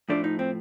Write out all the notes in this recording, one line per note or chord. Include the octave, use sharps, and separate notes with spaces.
A2 F3 A3 D4
D#4
C4